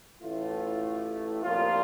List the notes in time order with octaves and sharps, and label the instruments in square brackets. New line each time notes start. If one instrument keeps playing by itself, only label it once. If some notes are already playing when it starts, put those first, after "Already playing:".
[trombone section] A1 A2 E3 A3 F4
C2 A#2 F3 A#3 F4